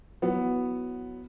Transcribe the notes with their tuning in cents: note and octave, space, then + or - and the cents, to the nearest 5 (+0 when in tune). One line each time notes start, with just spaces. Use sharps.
F#3 +0 B3 +0 E4 +0